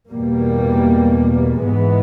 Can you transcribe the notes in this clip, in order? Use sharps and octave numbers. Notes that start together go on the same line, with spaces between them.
E2 B2 G3 A#3
G#2 E3 G#3 B3